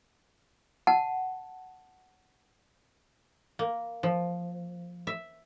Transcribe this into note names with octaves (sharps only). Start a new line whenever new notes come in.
F#5 A5
A#3
F3
E5